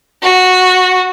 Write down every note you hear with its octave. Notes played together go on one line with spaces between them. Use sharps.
F#4